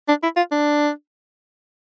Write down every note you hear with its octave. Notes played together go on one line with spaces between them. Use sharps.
D4
E4
F4
D4